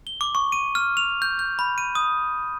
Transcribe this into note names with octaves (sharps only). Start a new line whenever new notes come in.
G7
D6
C#6
D#7
F6
F7
G6
G6
B5
D#7
D#6